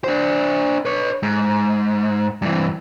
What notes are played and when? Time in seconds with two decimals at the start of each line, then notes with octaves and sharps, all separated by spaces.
0.04 D4 C5
0.85 B4 C#5
1.23 G#2
2.42 G2 E3